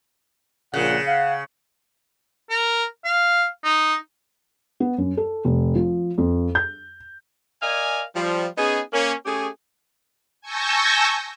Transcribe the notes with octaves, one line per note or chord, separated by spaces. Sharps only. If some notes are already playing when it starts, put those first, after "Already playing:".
A#1 A#2 C#3 F#5
F5 F#5
A#4
F5
D#4
B3
F#2
A4
F1
F3
F2
G6
A#4 D5 D#5 F5 G#5
F3 G3
B3 C#4 D#4 G#4
A#3 C#4
A3 C#4 G4 G#4
G#5 A5 C#6 E6 G6 A#6